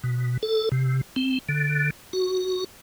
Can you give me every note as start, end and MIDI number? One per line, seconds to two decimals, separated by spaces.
0.04 0.37 47
0.43 0.69 69
0.72 1.01 48
1.16 1.38 60
1.49 1.90 50
2.13 2.64 66